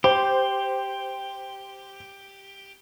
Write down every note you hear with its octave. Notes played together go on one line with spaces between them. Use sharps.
G4 C5